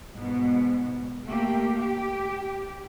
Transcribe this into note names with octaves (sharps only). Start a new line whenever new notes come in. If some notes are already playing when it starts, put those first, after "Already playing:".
G#2 B2 B3
A3 A#3 G4
G4